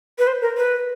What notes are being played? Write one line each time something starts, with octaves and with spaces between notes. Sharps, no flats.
B4
C5
A#4
B4